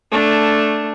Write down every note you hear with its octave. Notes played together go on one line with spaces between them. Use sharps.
A3 D4